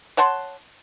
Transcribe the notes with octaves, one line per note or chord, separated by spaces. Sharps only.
C#5 F#5 A5 C6